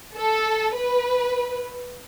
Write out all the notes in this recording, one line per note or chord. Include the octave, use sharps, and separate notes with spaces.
A4
B4